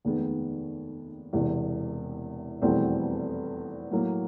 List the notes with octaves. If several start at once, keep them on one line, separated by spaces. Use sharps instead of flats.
F1 D#2 D#3 G#3 B3
E1 E2 C3
F1 E2 B2 G3 C4
A2 F#3 A#3